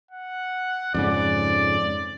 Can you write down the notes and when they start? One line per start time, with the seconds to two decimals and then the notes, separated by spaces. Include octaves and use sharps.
0.11 F#5
0.94 F2 G#2 C#3 D5